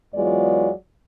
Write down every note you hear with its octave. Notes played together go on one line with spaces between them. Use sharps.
E2 F#3 G#3 B3 F4 D5